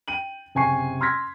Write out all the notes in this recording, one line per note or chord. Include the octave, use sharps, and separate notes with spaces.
G5 D#7 F#7
F#1 C3 G#5 C#6 C7
C6 E6 F6 G#6 A#6 B6